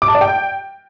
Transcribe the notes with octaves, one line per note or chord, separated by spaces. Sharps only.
D6
A5
D5
G5